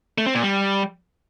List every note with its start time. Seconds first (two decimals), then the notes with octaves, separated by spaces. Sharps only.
0.18 A3
0.26 C4
0.35 A#2
0.43 G3